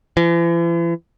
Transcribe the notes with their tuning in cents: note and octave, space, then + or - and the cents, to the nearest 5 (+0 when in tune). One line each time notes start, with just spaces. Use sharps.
E3 +45